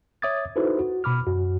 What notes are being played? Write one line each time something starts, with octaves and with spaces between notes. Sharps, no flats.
C#5 E5 D6 D#6 G#6 A6
D#4 E4 F#4 A4 B4 C5
F#4
B2 B5 D6 F6
F#2 F#4